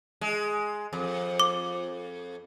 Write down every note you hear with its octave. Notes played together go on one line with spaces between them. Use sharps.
G#3
F2
D6